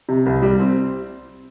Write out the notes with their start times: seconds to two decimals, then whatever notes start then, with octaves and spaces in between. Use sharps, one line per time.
0.09 C3
0.26 C2
0.42 G3
0.59 C4